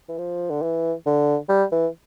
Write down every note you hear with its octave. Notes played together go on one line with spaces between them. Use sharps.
E3
F3
D3
E3
D3
G3
E3